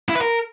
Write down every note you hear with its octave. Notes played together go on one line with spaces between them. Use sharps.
E4
B4
A#4